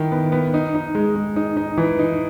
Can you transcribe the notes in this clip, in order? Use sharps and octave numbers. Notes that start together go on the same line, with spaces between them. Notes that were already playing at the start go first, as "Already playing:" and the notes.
Already playing: D#3 E4
B3
B3
D#4
D#4
G#3
G#3
D#4
D#4
E3
D#4